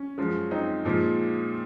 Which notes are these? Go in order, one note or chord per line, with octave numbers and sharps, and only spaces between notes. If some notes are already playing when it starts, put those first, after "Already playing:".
Already playing: C#4
F#2 F3 G#3
C4 D#4
A#2 F3 G#3